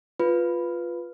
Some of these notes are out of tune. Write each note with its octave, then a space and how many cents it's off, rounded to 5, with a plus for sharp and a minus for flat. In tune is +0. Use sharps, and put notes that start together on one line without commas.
F4 +0 B4 +0